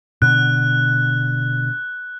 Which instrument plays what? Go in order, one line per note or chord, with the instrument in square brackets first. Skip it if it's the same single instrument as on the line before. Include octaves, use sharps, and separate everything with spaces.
[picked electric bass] B2 D3 [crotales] F#6